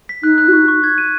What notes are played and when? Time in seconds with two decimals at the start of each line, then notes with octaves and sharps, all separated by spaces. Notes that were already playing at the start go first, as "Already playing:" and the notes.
0.09 B6
0.23 D#4 F#6
0.38 F#6
0.49 F#4
0.53 D#4 C#6
0.68 C#6
0.84 G#6
0.98 D#7